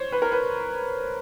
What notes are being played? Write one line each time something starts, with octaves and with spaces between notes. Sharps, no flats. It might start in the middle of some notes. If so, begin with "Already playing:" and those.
Already playing: C5 C#5
B4
A#4
B4